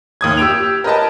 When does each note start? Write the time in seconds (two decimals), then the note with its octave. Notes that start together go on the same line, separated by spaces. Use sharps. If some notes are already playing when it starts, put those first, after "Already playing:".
0.21 D#2 D#6 G#6
0.37 G4 E6 D7 F7
0.84 A#4 B4 D#5 A5